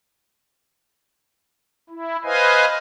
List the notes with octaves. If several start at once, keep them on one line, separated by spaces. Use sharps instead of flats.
E4
B4 C5 D#5 F5 G#5